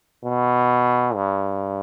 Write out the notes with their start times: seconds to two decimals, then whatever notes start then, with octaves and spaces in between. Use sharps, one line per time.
0.24 B2
1.15 G2